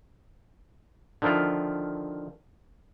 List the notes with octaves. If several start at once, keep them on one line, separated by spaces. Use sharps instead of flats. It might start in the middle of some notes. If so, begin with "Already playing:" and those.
D3 D#3 F3 E4 F4